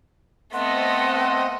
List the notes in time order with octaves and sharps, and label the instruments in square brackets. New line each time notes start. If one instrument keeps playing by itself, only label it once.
[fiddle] A3 B3 [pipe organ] C4 D#5 [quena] F#5 [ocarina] C6